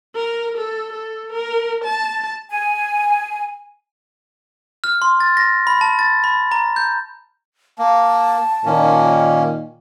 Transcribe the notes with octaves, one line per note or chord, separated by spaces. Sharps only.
A#4
A4
A4
A#4
A5
G#5
F6
C6
A6
A#6
B5
A5
A6
B5
A#5
G6
A#3 A5
A#2 D#3 A#3 C#4